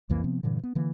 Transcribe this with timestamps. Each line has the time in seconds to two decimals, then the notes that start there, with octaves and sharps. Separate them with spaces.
0.09 C2 F2 E3 A#3
0.24 C3 F3 B3 C4
0.43 G2 A#2 D3 E3
0.63 B3
0.75 D3 E3 A#3